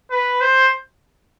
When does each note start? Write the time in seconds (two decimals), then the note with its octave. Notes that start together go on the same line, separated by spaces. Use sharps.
0.11 B4
0.41 C5